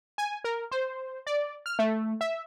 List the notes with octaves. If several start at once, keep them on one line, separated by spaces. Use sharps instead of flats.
G#5
A#4
C5
D5
F6
A3
E5